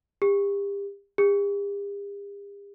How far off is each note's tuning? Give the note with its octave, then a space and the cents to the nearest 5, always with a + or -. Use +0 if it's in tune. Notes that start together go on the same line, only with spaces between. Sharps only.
G4 +35
G4 +45